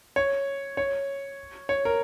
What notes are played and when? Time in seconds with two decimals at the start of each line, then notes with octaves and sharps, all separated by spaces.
0.16 C#5
0.77 C#5
1.69 C#5
1.85 A#4